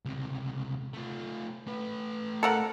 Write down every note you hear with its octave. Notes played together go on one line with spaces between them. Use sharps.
C#2 C3
A3 F4
A3 B4
A4 A#4 F#5